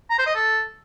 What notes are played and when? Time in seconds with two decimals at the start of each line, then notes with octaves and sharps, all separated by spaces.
0.10 A#5
0.18 C5
0.26 D#5
0.35 A4